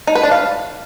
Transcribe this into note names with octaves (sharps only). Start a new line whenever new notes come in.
D#4
B4
D4
F5